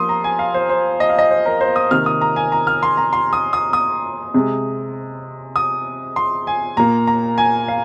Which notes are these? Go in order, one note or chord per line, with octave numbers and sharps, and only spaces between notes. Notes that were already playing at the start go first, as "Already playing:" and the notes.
Already playing: F3 A#3 C6 D#6
A#5
G#5
F5
C5
C5
D#5
F5
D#5
C5
A#4
C5
D#6
C3 D#3 A#3 F6
D#6
A#5
G#5
A#5
F6
C6
A#5
C6
D#6
D#6
D#6
C3 G#3
D#6
C6
G#5
A#2 A#3 A#5
A#5
G#5
F5